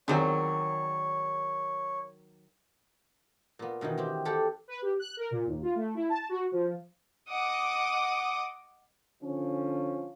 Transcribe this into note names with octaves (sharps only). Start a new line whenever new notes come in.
E2 D#3 F#3 C4 C#5
A#2 B3
B2 D#3 E3 D#4
C4 G4
G4 A4 D5 F#5
B4
G4
F#6
A#4
A#2
D#2
F4
A3
E4
A5
F#4
F3
D#5 F#5 D6 D#6
D3 F3 C#4